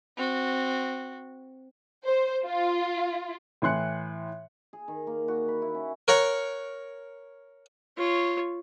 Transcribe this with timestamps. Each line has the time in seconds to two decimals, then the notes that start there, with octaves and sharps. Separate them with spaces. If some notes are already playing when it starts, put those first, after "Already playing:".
0.17 C4 F#4
2.04 C5
2.45 F4
3.62 A2 E3 C6 F#6 C#7
4.73 G#4
4.88 D#3
5.07 A#3
5.28 F#4
5.48 B5
5.62 E4
5.75 C#4
6.08 A#4 C#5 F#5 A#5
7.98 F4 C#5